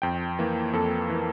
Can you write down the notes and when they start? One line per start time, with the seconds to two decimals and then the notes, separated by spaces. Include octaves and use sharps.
0.02 F2 G5
0.39 E3 A#3
0.73 F2 A4
1.10 E3
1.15 A#3